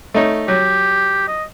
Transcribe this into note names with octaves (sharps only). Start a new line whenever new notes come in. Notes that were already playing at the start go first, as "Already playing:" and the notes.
A3 D#4 C#5
F#3 G4
D#5